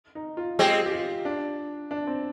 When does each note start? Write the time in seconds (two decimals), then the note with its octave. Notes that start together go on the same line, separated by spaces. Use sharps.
0.15 D#4
0.37 F4
0.59 G#3 C4 G4
0.86 G4
0.92 F4
1.25 D4
1.91 D4
2.07 C4